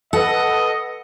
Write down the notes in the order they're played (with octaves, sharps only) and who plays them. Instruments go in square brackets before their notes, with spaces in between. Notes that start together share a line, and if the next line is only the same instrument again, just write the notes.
[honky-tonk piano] A4 B4 [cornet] D#5 [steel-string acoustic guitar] F#5